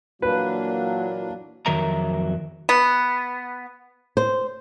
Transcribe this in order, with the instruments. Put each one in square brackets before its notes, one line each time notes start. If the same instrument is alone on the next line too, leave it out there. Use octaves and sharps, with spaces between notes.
[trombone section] A#2 E3 F#3 [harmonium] A#3 D4 [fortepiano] B4
[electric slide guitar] F2 D#3 F#3 A#4 E5 A#5
[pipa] B3
[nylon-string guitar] C5